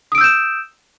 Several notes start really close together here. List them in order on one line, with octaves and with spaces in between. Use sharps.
D#6 D7 E6 G6 E7